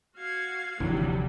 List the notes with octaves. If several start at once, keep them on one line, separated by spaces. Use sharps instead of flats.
F#4 F5 G#6
F1 D#2 D3 E3 F#3 G3